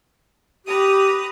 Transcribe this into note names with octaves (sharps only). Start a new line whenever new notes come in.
G4 B4 A#5 D#6